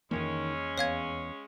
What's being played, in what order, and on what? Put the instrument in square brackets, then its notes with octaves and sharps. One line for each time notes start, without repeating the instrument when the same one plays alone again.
[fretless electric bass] F2 E3 A#3 [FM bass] D#3 [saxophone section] G#3 C#4
[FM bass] E2 [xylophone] C#5 F5 G#6